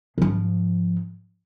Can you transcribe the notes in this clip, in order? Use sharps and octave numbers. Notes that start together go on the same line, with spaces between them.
G#2 F3